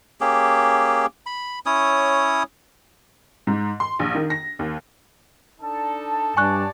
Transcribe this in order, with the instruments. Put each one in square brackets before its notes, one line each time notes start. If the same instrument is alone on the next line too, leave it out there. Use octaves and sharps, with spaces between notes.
[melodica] A#3 C#4 G4 G#4
B5
C#4 E4 C#5 D#6
[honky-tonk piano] G#2
C6
A#1
D#3
A#6
D#2
[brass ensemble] D4 D#4 A4 [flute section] A5
[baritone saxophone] G2 [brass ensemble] G4 C#5 D5 [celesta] G#5 C#6 F#6